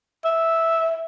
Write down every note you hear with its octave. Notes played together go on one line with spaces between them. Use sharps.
E5